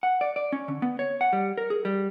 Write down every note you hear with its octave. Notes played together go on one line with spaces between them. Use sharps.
F#5
D5
D5
C#4
D3
B3
C#5
F#5
G3
A#4
G#4
G3